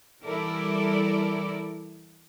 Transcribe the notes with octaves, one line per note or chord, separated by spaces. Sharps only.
E3 G3 E4 A4 A#4 D5